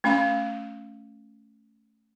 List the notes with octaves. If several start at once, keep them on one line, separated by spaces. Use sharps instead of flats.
A3 C#4 F5 B5